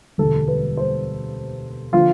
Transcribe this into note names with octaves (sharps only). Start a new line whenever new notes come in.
E1 D2 D3 G3 A4
B4
C5
D3 F3 F4